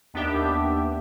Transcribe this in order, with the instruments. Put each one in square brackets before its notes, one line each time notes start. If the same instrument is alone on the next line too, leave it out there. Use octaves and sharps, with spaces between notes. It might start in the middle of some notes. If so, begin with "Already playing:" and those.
[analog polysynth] D#2 B3 D4 G4 E5